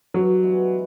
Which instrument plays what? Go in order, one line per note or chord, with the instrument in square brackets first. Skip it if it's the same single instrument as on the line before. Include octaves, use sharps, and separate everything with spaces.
[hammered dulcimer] G2 [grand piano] F#3
[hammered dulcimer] E3 G#3 B3